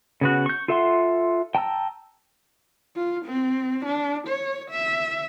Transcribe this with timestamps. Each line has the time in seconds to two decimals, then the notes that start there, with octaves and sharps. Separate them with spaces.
0.21 C#3 B3 F#4
0.46 C#6 G6
0.68 F4 A4 E5 F#5 C6
1.55 G5 A5 A#5 E6
2.96 F4
3.25 C4
3.85 D4
4.28 C#5
4.70 E5